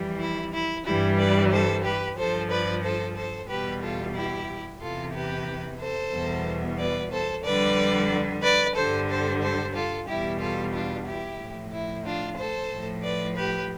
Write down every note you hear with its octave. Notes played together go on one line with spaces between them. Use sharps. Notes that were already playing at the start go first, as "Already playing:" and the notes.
Already playing: F2 E3 G3
E4
E4
G2 E3 G3 E4
B4 D5
A4 C5
G4 B4
G2 F3 A4 C5
B4 D5
A4 C5
A4 C5
E2 B2 G3 G4 B4
F4 A4
E4 G4
E2 C3 E3 F4 A4
G4 B4
A4 C5
E2 B2 G3
B4 D5
A4 C5
F2 D3 G3 B4 D5
B4 D5
G2 D3 G3 A4 C5
A4 C5
A4 C5
F4 A4
E2 B2 G3 E4 G4
F4 A4
D4 F4
E4 G4
A2 F3
E4
D4 F4
A4 C5
A2 F3
B4 D5
G4 B4